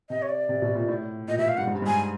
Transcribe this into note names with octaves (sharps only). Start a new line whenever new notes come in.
C3 D#5
C#5
D5
C3
B2
A#2
A2
A#2 D#5
B2 E5
F5
G2 F#5
G#2
G2
G#2 G#5